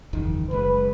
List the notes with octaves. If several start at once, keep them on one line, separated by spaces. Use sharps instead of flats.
F#1 E2 D#3
F#1 G#3 B4